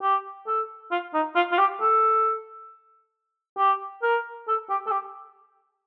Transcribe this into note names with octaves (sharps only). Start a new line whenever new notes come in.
G4
A4
F4
D#4
F4
F4
G4
A4
G4
A#4
A4
G4
A4
G4